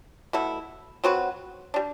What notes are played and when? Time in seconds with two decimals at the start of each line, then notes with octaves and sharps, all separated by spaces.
0.33 B2 A3 E4
1.04 F#3 C4 F#4 B4
1.74 G3 D4